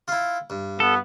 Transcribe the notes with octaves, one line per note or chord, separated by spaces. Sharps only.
E4 F4
G2
B3 A4